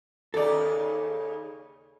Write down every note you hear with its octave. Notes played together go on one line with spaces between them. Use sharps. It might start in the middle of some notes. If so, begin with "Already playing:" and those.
D#2 C#3 D#4 A4 D5